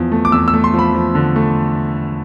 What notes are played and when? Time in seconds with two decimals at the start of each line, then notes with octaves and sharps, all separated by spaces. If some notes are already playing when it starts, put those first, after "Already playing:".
Already playing: E2 F3
0.12 A3
0.25 D6
0.32 E2 E6
0.48 E6
0.53 A3
0.64 C6
0.74 F3
0.79 B5
0.94 F3
1.15 D3
1.36 A3